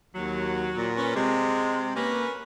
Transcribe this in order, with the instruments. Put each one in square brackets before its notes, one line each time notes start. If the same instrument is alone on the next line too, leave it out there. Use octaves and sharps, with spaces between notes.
[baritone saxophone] D#2 [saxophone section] F#3
[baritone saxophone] A#2
[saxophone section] C#4 B4
[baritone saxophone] C3 [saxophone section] G#3
[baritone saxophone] A#3 [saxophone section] C#4 A#4 B4